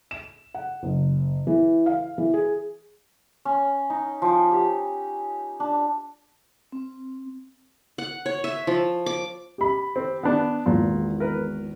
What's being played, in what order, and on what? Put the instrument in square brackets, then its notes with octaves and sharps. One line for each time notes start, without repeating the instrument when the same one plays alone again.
[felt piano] E7
F#5
F#1
E3
F5
E3
G#4
[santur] C#4
D#4
F3
G4
D4
[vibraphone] C4
[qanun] F#5
C#5
E5
F3
D6
[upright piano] G4 B5
[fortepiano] C4
B3 D4
[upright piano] G#1 E2 [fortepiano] A#2
[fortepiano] A#4 B4